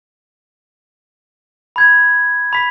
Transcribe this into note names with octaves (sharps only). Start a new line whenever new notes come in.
B5 G#6
B5 B6